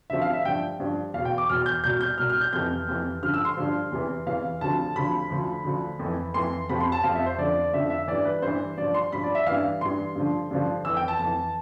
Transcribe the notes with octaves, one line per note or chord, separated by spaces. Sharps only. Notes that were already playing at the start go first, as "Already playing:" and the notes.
D2 C3 F3 E5
F5
E5
G2 F3 G5
G2 F3
E2 B2 F5
G5
D6
E2 B2 F6
G6
C2 B2 G6
G6
C2 B2 F6
F6
G6
F2 C3 E3 G6
F2 C3 E3
G2 D3 F3 F6
E6
C6
G2 D3 F3
E2 C3 E3
E2 C3 E3 F5
D2 C3 F3 A5
D2 C3 F3 B5
D2 D3 F3
D2 D3 F3
F2
E3
F2 E3 C6
F2 C3 F3 B5
C6
A5
F2 C3 F3 F5
E5
C5
F2 D3 F3 D5
F2 D3 F3 E5
E5
G2 E3 D5
B4
G2 C5
E3
G2 F3 D5
C6
G2 F3 B5
D5
E5
G2 E3 F5
G2 E3 C6
G2 D3 F3
G2 D3 F3
F2 E3 E6
G5
A5
F2 E3 A5